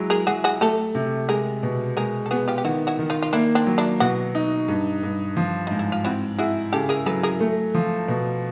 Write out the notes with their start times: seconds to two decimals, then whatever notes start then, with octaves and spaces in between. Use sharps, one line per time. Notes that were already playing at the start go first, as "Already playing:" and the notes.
Already playing: F#3 G#3 E4
0.10 G#4 A#4
0.27 F#3 F#4 G#4
0.44 F#4 G#4
0.61 A3 G4 A4
0.95 C3
1.28 G#3 G#4 A#4
1.63 B2
1.97 G#3 G#4 A#4
2.26 A4
2.31 B3 F#4 G#4
2.48 F4 G4
2.58 G4
2.64 D#3 E4 F#4
2.87 E4 F#4
2.99 D#3
3.10 D#4 F4
3.22 F4
3.33 A#3 D4 E4
3.55 C4 D4
3.67 F#3
3.78 D4 E4
4.00 B2 E4 F#4
4.35 D#4
4.68 G2
5.03 G2
5.37 F3
5.67 G#2 D#4
5.79 E4
5.92 F4
6.04 C4 E4 F#4
6.38 E4 F#4 G#4
6.72 C#3 G4 A4
6.89 G#4 A#4
7.06 F#3 A4 B4
7.23 G#4 A#4
7.40 A3
7.74 F3
8.08 B2